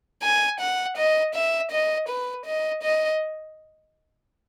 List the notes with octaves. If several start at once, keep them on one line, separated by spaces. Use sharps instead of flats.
G#5
F#5
D#5
E5
D#5
B4
D#5
D#5